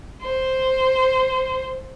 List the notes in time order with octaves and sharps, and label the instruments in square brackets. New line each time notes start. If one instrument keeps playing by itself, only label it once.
[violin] C5